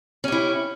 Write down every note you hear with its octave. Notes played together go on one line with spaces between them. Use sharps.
C#4 E4 G4